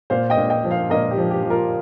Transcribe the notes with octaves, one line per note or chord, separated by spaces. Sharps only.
A#2 C5 F5
D#5 G5
A#2
D#5 G5
F3
C5 F5
A#2 A#4 D#5
G4
F3
G4
F3
F4 A#4